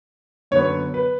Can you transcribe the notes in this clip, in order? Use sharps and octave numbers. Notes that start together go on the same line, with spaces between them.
F#2 D3 F#3 B3 C#5
B4